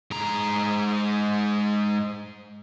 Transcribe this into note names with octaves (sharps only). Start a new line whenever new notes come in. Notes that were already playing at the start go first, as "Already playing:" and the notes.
G#2 A#5